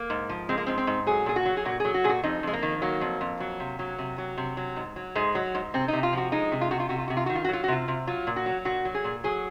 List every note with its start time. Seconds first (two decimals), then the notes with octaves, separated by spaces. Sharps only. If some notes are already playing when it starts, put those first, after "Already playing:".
Already playing: A#3
0.10 G#2
0.29 F3
0.49 G#3 C4
0.58 A#3
0.67 G#2 C4
0.78 C4
0.87 G#2
1.07 F#3 G#4
1.26 A#2 G#4
1.36 F#4
1.45 F#3
1.57 G#4
1.65 A#2 F#4
1.80 F#3 G#4
1.94 F#4
2.04 A#2 G#4
2.09 F#4
2.23 F2 D#4
2.43 F2 G#3
2.53 A#3
2.63 D#3
2.82 F#3 A#3
3.01 F2
3.21 F2
3.40 F#3
3.60 C3
3.79 F#3
3.98 C3
4.18 F#3
4.37 C3
4.57 F#3
4.76 G#2
4.96 F#3
5.15 G#2 G#3
5.35 F#3
5.55 G#2
5.74 C3 C4
5.88 C3 D#4
6.03 F4
6.13 F3 F#4
6.32 G#3 D#4
6.52 C3
6.61 F4
6.71 C3 F#4
6.80 F4
6.89 C3 F#4
6.98 F4
7.08 C3 F#4
7.17 F4
7.26 D#3 F#4
7.35 F4
7.44 F#4
7.49 F#3 F4
7.64 F#4
7.68 C3 F4
7.88 C3
8.07 F#3 F4
8.27 A#2
8.36 F#4
8.46 F#3
8.65 A#2 F#4
8.85 F#3
8.94 G#4
9.04 A#2
9.24 F#3 G#4